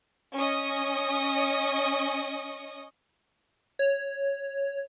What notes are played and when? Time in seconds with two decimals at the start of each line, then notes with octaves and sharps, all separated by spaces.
0.35 C#4 D#5 C#6 D#6
3.79 C#5